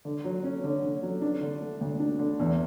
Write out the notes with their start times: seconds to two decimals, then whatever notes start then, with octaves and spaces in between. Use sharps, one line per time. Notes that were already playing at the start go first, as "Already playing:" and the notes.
0.05 D3
0.25 F#3
0.44 C#4
0.64 D3
0.83 D3
1.03 F#3
1.22 D4
1.42 D3
1.61 A3
1.81 D2
2.00 D4
2.19 D3
2.39 E2